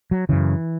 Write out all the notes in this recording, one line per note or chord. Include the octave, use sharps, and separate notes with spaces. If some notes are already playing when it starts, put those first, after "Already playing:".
F#3
F#2 C#3 E3